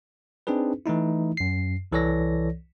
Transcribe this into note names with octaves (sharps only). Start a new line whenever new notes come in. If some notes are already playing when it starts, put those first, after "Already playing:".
C4 D4 D#4 G#4 B4
E3 A3 D#4 E4
F#2 C7
C2 E3 A4 C#5 D5 A#6